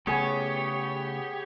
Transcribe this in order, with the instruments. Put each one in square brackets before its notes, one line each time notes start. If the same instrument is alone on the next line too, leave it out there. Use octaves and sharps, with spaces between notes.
[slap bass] C#3 A3 [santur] B3 G#4 G#5 [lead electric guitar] G4 [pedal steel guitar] C#5